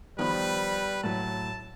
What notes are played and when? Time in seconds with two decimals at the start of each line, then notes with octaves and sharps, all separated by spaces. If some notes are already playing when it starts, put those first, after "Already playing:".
0.19 D#3 F3 G3 B3 B4 B5
1.04 A2 F#3 A5